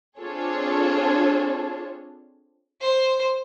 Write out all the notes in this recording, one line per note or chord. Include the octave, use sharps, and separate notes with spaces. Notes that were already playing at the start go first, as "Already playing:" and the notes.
C4 D4 F4 G#4 A4 C#5
C5